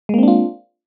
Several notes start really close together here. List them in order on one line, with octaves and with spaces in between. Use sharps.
G#3 A#3 C4 D4 F4